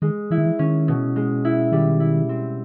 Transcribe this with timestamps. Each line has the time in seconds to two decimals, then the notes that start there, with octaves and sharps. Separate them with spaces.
0.02 D#3 G#3
0.31 E3 E4
0.38 D#3
0.46 E3
0.59 D#3 C#4
0.88 B2
1.16 G#3
1.45 E4
1.72 D#3 G3
2.00 E4
2.29 C4